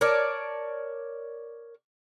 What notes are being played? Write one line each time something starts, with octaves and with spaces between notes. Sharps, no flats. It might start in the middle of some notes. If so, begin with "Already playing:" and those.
A#4 C#5 D5 A5